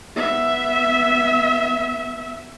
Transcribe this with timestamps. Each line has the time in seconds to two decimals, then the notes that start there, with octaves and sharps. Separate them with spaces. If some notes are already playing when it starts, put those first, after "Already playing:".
0.16 B3 E5